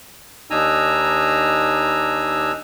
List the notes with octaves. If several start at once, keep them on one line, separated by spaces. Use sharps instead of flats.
D#2 D4 D#4 G#5 A#5 E6